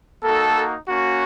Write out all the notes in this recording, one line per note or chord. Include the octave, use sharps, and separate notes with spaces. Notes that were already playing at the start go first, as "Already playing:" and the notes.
A#3 D#4 F#4 A4
A#3 C#4 F#4